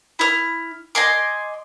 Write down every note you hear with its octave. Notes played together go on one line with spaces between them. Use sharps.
E4 F6
D#5 G#5 C6 D6